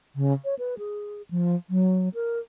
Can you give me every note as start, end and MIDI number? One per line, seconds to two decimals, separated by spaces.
0.15 0.33 49
0.45 0.55 73
0.59 0.75 71
0.78 1.22 68
1.31 1.55 53
1.70 2.09 54
2.14 2.39 70